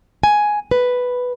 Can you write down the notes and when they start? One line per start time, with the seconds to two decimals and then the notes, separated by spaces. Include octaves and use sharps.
0.23 G#5
0.71 B4